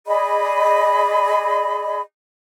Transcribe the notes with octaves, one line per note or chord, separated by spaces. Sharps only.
G#4 D5 D#5 B5